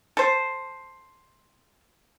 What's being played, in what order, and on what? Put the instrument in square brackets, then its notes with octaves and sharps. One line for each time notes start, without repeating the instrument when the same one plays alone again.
[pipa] A4 C5